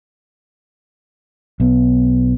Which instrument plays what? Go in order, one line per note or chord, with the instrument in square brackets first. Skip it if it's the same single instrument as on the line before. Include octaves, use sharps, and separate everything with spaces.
[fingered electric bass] B1 B3